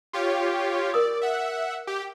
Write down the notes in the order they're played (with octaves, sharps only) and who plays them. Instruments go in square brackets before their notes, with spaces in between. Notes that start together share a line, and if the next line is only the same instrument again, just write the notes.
[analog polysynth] F4 G4 C#5
[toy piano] A#4 D#6 [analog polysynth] D5
[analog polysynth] E5 F#5
G4